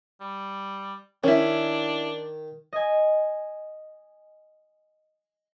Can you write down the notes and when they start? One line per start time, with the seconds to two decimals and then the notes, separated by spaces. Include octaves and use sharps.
0.21 G3
1.24 D#3 C#4 D4 E4
2.73 D#5 G#5